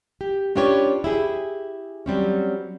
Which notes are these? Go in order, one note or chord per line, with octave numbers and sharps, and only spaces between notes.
G4
C#4 D4 F4 G4 B4 C#5
E4 G4 G#4
F#3 G3 C4 C#4